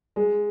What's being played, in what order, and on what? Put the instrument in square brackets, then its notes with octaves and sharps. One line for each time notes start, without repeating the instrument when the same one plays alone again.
[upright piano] G#3